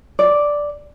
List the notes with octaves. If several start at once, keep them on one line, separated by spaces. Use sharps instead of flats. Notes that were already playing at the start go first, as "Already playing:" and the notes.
D5